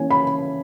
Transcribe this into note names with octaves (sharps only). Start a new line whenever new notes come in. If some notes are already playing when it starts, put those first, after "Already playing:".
Already playing: E3 A#3 C#4 G#5
B5